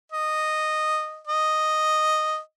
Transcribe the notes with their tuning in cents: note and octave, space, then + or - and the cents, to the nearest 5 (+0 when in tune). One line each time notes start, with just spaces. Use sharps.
D#5 -10
D#5 -5